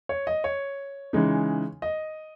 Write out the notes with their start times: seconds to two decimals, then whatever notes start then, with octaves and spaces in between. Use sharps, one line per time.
0.09 C#5
0.27 D#5
0.44 C#5
1.13 C#3 E3 G#3 D#4
1.82 D#5